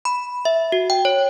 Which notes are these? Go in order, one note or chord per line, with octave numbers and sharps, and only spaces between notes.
B5
E5
F#4
G5
C#5